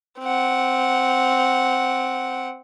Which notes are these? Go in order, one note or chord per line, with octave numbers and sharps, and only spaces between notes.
C4 F#5